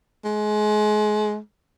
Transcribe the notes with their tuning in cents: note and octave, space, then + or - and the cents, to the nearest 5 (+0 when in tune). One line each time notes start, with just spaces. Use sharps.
G#3 +30